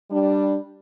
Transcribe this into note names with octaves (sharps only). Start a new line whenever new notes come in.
G3 D4